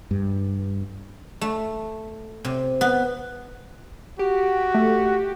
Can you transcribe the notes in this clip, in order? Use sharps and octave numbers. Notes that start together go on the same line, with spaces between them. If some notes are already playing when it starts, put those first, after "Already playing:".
G2
A3
C3
B3
F#4 G4
A3